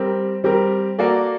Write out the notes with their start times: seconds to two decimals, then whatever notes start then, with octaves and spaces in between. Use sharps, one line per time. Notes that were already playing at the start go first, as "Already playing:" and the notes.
Already playing: G3 C4 G4 A#4
0.44 G3 C4 G4 A#4
0.98 A#3 F#4 A4 D5